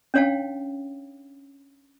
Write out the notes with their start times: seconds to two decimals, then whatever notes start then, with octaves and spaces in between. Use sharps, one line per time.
0.14 C#4 D4 C#5 F5 G5 A5